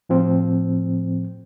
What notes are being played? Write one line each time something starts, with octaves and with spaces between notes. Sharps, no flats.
A2 F3 C4